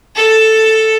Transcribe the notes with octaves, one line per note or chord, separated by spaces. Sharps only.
A4